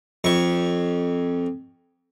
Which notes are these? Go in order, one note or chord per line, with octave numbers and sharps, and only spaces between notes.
F2 C#6